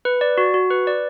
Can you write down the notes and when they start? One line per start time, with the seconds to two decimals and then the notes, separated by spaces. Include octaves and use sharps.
0.05 B4
0.21 D5
0.38 F#4
0.54 F#4
0.70 B4
0.87 D5